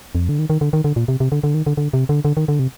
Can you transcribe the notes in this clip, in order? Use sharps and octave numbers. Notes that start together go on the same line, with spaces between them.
F2
D3
D#3
D#3
D3
D#3
D3
A#2
C3
C3
D3
D3
D#3
D3
D3
C3
D3
D3
D#3
D3
C3